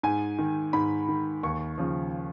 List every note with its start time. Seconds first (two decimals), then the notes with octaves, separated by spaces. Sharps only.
0.03 G#2 G#5
0.39 D#3
0.73 G#2 B5
1.08 D#3
1.43 D#2 C#6
1.78 C#3 F3